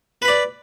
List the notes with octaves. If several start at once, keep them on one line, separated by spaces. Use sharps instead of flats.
B4 D5 B5